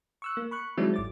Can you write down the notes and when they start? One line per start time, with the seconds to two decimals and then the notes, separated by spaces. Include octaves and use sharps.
0.22 C#6 E6 F#6
0.37 A#3
0.51 B5 C#6 F#6
0.77 D#3 F#3 G#3 C4 D4 E4
0.94 G#1 D6 A6